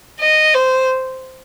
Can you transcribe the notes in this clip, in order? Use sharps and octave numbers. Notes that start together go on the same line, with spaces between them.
D#5
C5